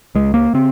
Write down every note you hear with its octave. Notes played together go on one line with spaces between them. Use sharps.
C#2 G#3
A#3
C#3 C4